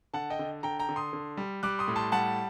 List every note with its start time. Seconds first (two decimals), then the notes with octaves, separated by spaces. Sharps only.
0.13 D3 F#5 A5
0.30 D#5 G5
0.39 D3
0.63 D3 G5 A#5
0.79 G5 A#5
0.89 D3
0.96 C6 D#6
1.13 D3
1.37 G3
1.63 G3 D6 F#6
1.79 C6 D#6
1.88 A2
1.96 A5 C6
2.12 G3 F#5 A5